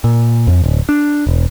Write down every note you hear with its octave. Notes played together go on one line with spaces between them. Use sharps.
A#2
F2
D1
D4
E1